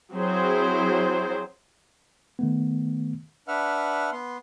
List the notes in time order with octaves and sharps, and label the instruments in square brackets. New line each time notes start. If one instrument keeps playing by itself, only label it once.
[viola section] F#3 C4 E4 G#4 C5
[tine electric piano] D#3 A3 B3
[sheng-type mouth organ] D4 B4 E5 F#5 F6
B3 C6